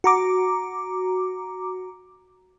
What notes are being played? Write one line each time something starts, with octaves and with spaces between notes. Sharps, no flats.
F#4 A#5 D6